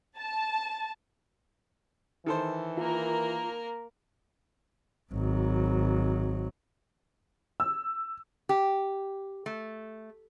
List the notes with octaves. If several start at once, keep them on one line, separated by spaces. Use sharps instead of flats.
A5
D#3 E3 A4 C5
A#3 F4 A#4
G#1 F#3
E6
G4
A3